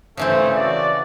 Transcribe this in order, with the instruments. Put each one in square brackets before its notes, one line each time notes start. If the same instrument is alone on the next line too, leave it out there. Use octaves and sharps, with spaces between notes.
[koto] C#3 E3 C4 [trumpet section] A3
[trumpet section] F#4 D5